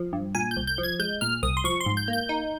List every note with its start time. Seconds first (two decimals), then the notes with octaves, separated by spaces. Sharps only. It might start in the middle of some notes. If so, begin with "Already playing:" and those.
Already playing: F3
0.13 G2
0.35 A#2 G#5
0.51 G6
0.57 C2
0.67 G6
0.78 F3
0.83 G#6
0.99 G#3 G6
1.21 A#2 F6
1.43 C2 D#6
1.57 C6
1.64 F3 C#6
1.80 C6
1.86 G#2
1.97 G6
2.08 A#3
2.13 G6
2.29 D#4